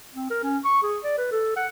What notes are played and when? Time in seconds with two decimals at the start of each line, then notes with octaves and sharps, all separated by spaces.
0.15 C4
0.30 A#4
0.43 C#4
0.65 C#6
0.83 G#4
1.04 D5
1.18 B4
1.31 A4
1.57 F#5